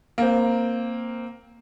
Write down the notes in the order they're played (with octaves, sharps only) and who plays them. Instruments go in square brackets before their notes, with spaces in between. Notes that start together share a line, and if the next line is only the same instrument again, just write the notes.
[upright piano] A#3 C4